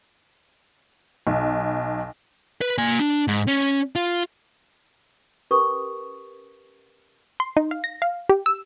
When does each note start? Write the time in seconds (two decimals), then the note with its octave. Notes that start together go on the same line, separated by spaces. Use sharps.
1.27 B1
2.61 B4
2.78 A#3 G#5
2.99 D4
3.28 G#2
3.48 C#4
3.96 F4
5.51 C#4 G4 A#4 B4 C#6 D#6
7.40 C6
7.57 D#4
7.71 F5
7.84 A#6
8.02 F5
8.29 G4
8.46 E6